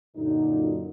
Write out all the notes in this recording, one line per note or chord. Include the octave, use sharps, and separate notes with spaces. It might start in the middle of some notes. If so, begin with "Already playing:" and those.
F#2 A#2 D3 D#4